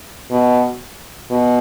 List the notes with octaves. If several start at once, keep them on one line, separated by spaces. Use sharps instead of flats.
B2
B2